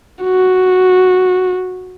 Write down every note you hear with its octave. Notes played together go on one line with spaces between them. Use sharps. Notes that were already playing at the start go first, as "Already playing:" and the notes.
F#4